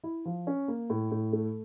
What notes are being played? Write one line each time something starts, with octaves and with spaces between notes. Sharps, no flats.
E4
F3
C#4
A#3
A2
A2
A3